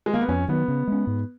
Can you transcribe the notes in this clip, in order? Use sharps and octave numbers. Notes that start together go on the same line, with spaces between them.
G#3
A#3
B3
F2 C#4
D#3 F#3 B3
C#3
G#3 C#4
G#2